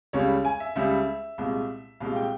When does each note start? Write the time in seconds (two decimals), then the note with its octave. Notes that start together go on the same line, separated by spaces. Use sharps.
0.13 C#2 C#3 G3 C#5
0.45 G#5
0.60 E5
0.76 C#2 C#3 G3 E5
1.38 C2 A#2 G#3
2.00 C2 A#2 G#3 F5
2.16 G5